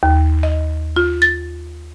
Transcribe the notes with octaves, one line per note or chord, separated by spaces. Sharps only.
D#2
D#5
F4
A6